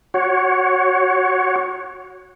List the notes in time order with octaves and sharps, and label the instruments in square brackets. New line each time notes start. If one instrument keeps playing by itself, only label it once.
[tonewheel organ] F#4 C#5